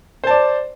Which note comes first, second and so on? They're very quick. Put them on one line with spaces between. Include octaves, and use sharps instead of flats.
C5 A5 D5